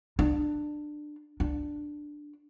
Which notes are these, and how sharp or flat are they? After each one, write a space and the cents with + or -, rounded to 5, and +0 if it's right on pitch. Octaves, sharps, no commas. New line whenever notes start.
D4 +20
D4 +5